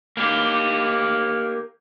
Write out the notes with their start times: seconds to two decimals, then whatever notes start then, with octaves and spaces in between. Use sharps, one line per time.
0.17 A#3 G4